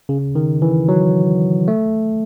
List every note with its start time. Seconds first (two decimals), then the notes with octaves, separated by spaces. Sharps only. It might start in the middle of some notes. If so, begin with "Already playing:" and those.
0.09 C#3
0.35 D#3
0.62 E3
0.89 F#3
1.68 A3